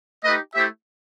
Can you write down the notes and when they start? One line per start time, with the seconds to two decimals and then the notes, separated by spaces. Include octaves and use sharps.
0.24 A3 D#4 G4 B4 D#5
0.54 A3 E4 G4 C5 E5